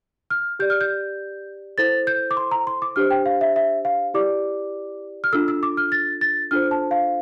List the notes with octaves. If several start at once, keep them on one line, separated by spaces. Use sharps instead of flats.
F6
G4 D5 G6
F6
G6
E4 A4 C5 A6
G6
D6
C6
A#5
C6
D6
D4 G4 C5 F6
G5
F5
E5
E5
F5
E4 G4 D5 D6
F6
D4 F4 A4 E6
E6
D6
F6
A6
A6
D4 F4 A4 C5 F6
A5
F5